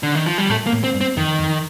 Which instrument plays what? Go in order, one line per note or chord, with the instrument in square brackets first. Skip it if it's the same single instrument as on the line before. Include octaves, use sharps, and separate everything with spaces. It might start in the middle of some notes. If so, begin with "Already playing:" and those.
[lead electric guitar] D3
D#3
F3
G3
[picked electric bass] A2 [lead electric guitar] A3
[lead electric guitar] A#3
[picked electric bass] A2
[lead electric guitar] C4
[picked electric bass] G2
[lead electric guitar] C4
[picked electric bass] F2 [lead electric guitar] D#3
[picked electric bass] F2